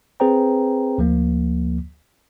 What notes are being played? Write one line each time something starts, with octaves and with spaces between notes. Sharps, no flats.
C4 G#4 B4 C5 G5 A#5
D2 F3 A#3